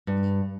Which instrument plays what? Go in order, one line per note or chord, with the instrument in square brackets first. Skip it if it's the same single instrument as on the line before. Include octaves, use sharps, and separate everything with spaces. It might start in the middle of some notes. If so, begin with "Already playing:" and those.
[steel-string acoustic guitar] G2